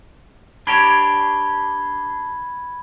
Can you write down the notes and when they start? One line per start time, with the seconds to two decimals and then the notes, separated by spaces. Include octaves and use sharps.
0.67 D4 G4 C#5 B5 G#6 G7